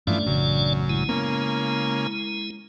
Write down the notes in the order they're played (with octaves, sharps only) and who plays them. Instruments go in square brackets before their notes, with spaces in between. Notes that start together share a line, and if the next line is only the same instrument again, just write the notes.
[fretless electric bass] G2 A3 [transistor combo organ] E3 F3 [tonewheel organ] C#4 D4 D5
[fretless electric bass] A1 C#3 [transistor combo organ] F#2
[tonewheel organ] G#3 E4
[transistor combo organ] C#3 A#3 [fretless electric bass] B3